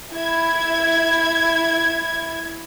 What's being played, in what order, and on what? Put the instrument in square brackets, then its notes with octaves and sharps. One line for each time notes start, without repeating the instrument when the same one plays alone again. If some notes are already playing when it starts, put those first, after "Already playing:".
[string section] E4 G#6